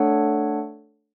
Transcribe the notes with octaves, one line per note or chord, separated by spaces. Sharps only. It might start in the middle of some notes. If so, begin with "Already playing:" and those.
Already playing: A3 D4 A4 C#5 F#5